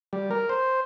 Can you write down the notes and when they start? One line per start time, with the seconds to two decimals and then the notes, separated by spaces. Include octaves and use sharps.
0.13 G3
0.31 A#4
0.49 C5